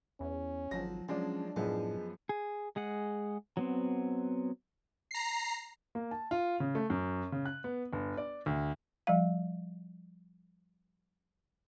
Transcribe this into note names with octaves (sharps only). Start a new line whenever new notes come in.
E2 C#4
G#1 F3 F#3 A#6
F3 F#3 G#3 C#4 D4 D5
F#2 A2 F3 G#3 B3
G#4
G#3 G#4 F#5
F#3 B3 C4
A#5 C7
A#3
A5
F4
C#3
A3
F#2
C#3
F#6
B3
G1
D5
D2
F3 G3 F5